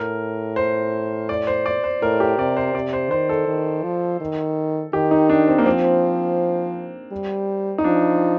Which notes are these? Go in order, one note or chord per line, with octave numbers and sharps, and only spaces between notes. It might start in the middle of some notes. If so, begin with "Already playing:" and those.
Already playing: A2 A#4
C5
D5
C5
D5
C5
A2 A#4
G4
C3 D5
C5
C3 D5
C5
D#3 C5
A4
D#3
F3
D#3
D#3 G4
D#4
D4
C4
A#3
F3 C4
G3
D#4
F3 D4